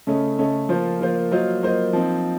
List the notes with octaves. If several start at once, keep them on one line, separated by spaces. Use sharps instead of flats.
C#3 A3 C#4 A4 D#5
C#3 A3 C#4 A4 D#5
F3 A#3 F4 C5
F3 A#3 F4 C5
F#3 A#3 F4 C5 D#5
F#3 A#3 F4 C5 D#5
F3 C4 D#4